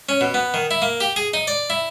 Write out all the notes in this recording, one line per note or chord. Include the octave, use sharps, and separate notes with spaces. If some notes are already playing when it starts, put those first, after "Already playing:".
C#4
B2
B3
D#3
E4
A#3
G4
G#4
D#4
D5
E4